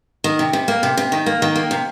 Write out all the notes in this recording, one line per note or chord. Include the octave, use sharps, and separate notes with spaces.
D#3
C3
C3
A#3
C3
C3
D#3
A#3
D#3
A#3
C3